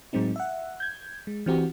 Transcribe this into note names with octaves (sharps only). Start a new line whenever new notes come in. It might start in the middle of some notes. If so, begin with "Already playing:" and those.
A2 F#3 G#3 C4 D#4
E5 F#5
G6 G#6
G#3
E3 C4 F#4 G4